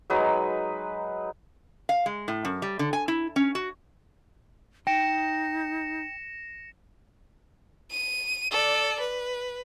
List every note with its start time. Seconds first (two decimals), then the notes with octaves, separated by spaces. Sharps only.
0.10 F#3 G#3 D#4 B4
1.89 F5
2.06 G#3
2.28 A2
2.45 F#2
2.62 G3
2.79 D3
2.93 G#5
3.08 E4
3.36 C#4
3.55 F#4
4.87 D#4 G5 A#6 C#7 E7
7.91 D#7
8.51 A4 D5
9.00 B4